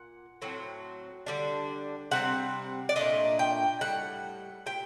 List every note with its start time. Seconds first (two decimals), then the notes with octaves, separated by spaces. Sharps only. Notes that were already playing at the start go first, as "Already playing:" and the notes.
Already playing: A#2 F#5
0.42 A2 F#3 C4
1.26 D3 G3 D4
2.11 C3 G3 C4 F#5
2.89 D5
2.96 A#2 A3 D4 D#5
3.39 G5
3.81 A2 G3 F#5
4.66 A#2 G3 G5